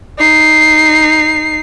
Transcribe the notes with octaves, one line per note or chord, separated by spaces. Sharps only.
D#4 C7